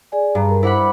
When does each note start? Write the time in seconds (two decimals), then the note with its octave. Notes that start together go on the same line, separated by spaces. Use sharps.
0.12 G#4 D5 G#5
0.35 G2 G#4 A#5
0.49 A#4
0.63 E4 C5 F#5 B5 D6